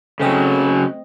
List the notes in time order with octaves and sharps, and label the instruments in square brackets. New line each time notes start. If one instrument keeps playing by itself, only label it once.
[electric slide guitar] C#3 F#3 [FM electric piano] A3 C4 D#5 [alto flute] A4